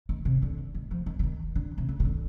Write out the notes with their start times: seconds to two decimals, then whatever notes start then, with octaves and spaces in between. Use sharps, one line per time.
0.09 D#3
0.25 C3
0.42 D3
0.75 D#3
0.91 F3
1.06 D#3
1.19 D3
1.23 D#3
1.55 D3
1.78 C3
1.89 D3
2.00 C3
2.05 D3